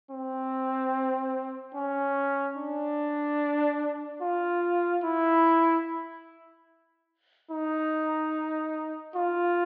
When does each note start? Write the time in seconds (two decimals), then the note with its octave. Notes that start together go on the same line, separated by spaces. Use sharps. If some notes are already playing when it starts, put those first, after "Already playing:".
0.11 C4
1.74 C#4
2.57 D4
4.21 F4
5.03 E4
7.51 D#4
9.15 F4